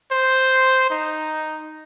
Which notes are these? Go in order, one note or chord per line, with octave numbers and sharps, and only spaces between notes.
C5
D#4